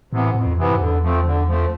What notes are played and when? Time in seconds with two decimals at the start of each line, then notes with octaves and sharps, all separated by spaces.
0.12 A2 C3 E3 B3
0.34 F2 A2
0.46 E2
0.57 F2 C3 E3 B3
0.69 G#2
0.80 E2 D3
1.02 F3 A3 C4
1.25 D3
1.47 F3 A3 C4